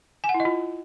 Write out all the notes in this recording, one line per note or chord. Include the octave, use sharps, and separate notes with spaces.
G#5
F#5
E4
D#5
F4